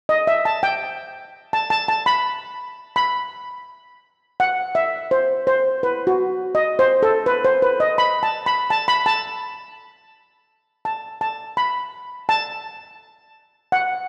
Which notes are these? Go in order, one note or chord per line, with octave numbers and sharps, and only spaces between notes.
D#5
E5
A5
G5
A5
A5
A5
B5
B5
F#5
E5
C5
C5
B4
F#4
D#5
C5
A4
B4
C5
B4
D#5
B5
A5
B5
A5
B5
A5
A5
A5
B5
A5
F#5